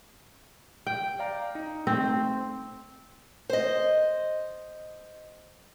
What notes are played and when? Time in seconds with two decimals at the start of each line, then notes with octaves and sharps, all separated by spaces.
0.87 G5
1.19 D5 F5 A#5
1.55 D#4
1.87 A3 C4
3.50 C5 D#5